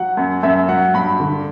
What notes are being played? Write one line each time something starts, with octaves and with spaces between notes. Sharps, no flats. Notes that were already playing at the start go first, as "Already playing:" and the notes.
Already playing: F#3 F#5
F#2
F#2 E5
F#3 F#5
G2 B5
D3